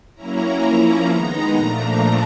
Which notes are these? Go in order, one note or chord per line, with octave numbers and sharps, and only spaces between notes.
F#3 A#3 C#4 E4 A#5
F3 A#3 C#4 E4
D#3 G#3 B3 D#4
A#2 F3 A3 D4 A#5